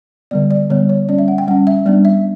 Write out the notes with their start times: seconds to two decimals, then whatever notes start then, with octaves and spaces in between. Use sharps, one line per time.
0.31 D3 G3 B3 D5
0.51 D5
0.70 D3 G3 B3 C#5
0.89 C#5
1.08 G3 C#4 D5
1.18 E5
1.28 F#5
1.38 G5
1.48 G3 C#4 F#5
1.67 E5
1.86 G3 B3 D4 D5
2.05 E5